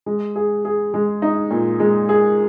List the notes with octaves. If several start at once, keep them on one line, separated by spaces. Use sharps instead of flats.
G#3
G#4
G#4
G#3
D#4
A#2
G#3
G#4